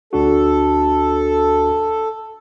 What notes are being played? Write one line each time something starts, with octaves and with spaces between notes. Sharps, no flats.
D2 D4 F#4 A4